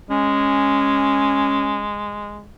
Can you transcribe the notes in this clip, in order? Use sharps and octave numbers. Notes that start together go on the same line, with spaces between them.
G#3 C#4